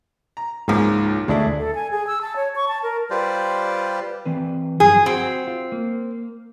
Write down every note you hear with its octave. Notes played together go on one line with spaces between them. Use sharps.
A#5
C#2 G#2 F3 A#3
D2 G#3 A3 D4 E4
A4
G#5
G#4
E6
A5
C#5
C#6
A5
A#4
G3 F4 G4 B4 C5 D5
E3 C4 B4
G2 F3 F#3 G#4
C4 F#4
F4
A#3